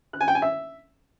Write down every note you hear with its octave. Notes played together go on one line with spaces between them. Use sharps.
F#6
G#5
G5
G#5
E5